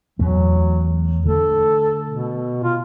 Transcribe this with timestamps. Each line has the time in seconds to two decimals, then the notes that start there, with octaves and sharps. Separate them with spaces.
0.19 E2 F#3 A3
1.26 D3 A3 A4
2.08 B2
2.64 F4